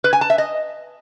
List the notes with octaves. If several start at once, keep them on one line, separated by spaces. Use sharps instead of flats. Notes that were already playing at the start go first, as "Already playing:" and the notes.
B4
G#5
A5
E5
D#5